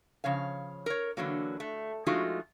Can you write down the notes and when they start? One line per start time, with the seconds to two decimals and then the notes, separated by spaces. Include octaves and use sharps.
0.24 C#3 F3 C#5 F5
0.86 A#4 C#5
1.17 D3 E3 F#3 A#3
1.60 A3
2.06 F3 G#3 A3 D#4 F4 F#4